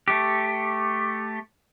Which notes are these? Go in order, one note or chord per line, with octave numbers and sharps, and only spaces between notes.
A3 G4